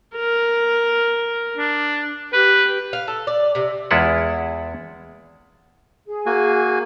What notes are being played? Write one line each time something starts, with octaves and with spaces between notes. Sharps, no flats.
A#4
D4
G4 B4
F5
A4
D5
C3
E2 G#3 E4 F4 E5 F#5
G#4
A#3 F#4 G#5